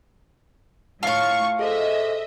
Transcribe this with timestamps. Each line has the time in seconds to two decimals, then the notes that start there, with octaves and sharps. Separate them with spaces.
1.03 A2 F4 F5 A5 C#6
1.59 G#4 A4 C5 D#5 E5